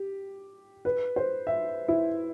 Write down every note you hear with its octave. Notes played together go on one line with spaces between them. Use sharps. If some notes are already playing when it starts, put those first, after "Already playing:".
Already playing: G4
B4
C5
E5
E4